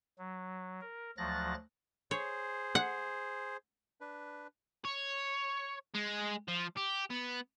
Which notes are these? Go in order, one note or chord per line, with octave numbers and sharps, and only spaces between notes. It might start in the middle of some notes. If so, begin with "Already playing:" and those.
F#3
A#4
D2 F3 F#3 F#6 A6 A#6
G#4 C5 C#5
F#5
D4 B4
C#5
G#3
F3
G4
B3